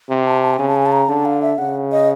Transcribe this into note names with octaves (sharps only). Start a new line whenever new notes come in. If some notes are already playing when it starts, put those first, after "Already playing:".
C3
A5
A5
G5
C#3 G#5
A5
G#5
A5
A#5
D3 A5
F5
E5
C#3 F#5
D#5